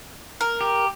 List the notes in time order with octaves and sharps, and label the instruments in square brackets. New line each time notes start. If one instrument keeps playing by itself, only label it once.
[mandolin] A#4
[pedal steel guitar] G4